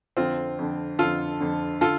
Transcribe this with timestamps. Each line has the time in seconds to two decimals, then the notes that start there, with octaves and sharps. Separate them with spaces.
0.17 F2 D3 C4 F4
0.59 F2 D3
0.99 F2 D3 F4 A4
1.40 F2 D3
1.81 D3 F4 A4